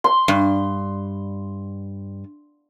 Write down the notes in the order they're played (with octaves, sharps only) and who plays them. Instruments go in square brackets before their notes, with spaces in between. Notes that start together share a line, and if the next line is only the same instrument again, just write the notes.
[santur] C6
[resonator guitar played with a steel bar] G2